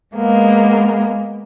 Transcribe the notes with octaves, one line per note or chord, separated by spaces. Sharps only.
G#3 A#3 B3